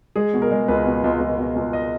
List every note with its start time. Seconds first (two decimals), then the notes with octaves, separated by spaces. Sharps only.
0.16 G#3 G#4
0.34 B2
0.42 A#4
0.51 G#3
0.68 C#2 B4
0.86 B2
1.04 C#2
1.21 C#2
1.38 B2
1.56 C#2
1.73 D#5